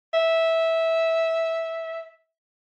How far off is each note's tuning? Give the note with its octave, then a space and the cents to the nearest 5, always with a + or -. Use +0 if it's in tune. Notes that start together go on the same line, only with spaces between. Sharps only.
E5 -10